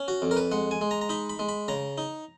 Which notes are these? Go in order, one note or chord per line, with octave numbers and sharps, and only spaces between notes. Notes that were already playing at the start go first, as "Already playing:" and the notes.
Already playing: C#4
F#4
F2
A#4
B4
G#3 F#5
G#5
G#3
A#5
A#5
D#4 B5
B5
G#3
B5
C#3 A#5
D#4